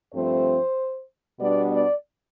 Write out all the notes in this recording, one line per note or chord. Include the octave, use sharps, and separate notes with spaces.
G2 F3 A3 C4 C5
B2 G3 B3 D4 D5
D5